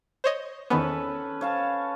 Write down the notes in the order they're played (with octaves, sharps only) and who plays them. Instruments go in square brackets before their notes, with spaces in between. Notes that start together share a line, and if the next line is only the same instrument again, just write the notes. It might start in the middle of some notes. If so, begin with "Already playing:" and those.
[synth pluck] C5 C#5 D#5
[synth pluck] E2 D#3 B3 [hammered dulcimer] C#4 A4 B4
[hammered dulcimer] C#5 F5 A5